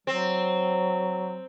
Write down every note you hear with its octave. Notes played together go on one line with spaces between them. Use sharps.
F#3 C4